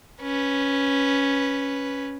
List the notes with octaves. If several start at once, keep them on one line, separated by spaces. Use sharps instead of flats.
C#4 B4